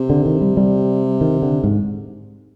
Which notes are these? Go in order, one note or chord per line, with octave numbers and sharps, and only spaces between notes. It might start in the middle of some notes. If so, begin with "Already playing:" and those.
Already playing: C3
D3
D#3
G3
G3
D#3
D3
G#2